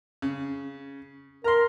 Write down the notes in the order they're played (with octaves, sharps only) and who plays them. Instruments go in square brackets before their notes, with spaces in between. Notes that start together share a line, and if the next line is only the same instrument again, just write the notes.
[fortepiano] C#3
[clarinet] A#4 [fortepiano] A#5 C6